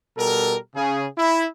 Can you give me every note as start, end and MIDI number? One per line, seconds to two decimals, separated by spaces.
0.17 0.56 47
0.17 0.56 55
0.17 0.56 69
0.17 0.56 70
0.75 1.06 49
0.75 1.06 68
1.18 1.46 64